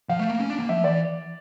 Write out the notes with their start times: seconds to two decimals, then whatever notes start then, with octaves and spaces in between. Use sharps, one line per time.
0.09 F3 F5
0.19 A3
0.30 A#3
0.39 C#4
0.50 D4
0.59 A#3
0.69 F3 E5
0.84 E3 D5